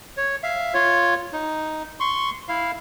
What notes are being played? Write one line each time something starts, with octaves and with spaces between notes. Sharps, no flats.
C#5
E5 F5
F4 C#5
D#4
C6 C#6
E4 F5